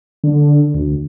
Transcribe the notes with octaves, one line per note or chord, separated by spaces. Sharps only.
D3
D2